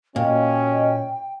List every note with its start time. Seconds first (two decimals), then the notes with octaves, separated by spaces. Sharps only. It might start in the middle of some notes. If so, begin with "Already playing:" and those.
0.16 A#2 C#4 F#4 D#5 G5